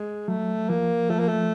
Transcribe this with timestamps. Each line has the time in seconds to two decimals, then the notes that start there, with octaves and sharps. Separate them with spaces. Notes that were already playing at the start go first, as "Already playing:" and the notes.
Already playing: G#3
0.28 F#3 A3
0.69 F3 A#3
1.10 F3 A3
1.20 A#3
1.28 A3